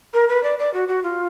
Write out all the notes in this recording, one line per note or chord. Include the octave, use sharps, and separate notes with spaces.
A#4
B4
D5
D5
F#4
F#4
F4